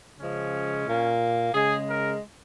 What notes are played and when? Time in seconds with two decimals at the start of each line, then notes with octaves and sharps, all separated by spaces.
0.19 C#3 F3 G#3 C#4
0.88 A#2 A#3
1.54 C#3 G#3 G#4
1.89 A#4